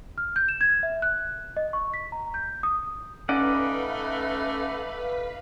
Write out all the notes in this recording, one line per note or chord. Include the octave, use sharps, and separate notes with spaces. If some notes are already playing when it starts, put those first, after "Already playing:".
F6
G6
E7
G#6
E5
F#6
D#5
C#6
B6
A#5
G6
D#6
A3 C#4 D#4 B4 D5 F5 F#5 B5